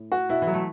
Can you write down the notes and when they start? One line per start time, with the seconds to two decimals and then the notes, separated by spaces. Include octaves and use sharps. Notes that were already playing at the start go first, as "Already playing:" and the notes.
Already playing: A2
0.12 F#4
0.29 B2 E4
0.42 E3
0.47 F#3
0.54 A3